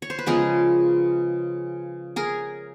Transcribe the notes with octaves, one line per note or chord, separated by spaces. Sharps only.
C#5
C5
B4
C#3 F3 G#3 B3 G#4 A#4
G#4 A#4